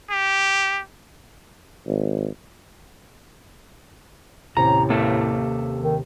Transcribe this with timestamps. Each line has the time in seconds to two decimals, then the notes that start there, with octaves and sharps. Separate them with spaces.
0.11 G4
1.86 G#1
4.57 D#2 A2 C3 C#4 A#5
4.90 A#3 A4
5.83 D#3